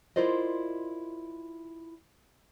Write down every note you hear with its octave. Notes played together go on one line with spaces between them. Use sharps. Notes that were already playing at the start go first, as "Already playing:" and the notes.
E4 F4 A#4 C5 D5 D#5